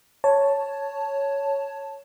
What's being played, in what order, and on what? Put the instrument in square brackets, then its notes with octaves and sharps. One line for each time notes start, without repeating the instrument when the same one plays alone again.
[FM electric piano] C#5 A5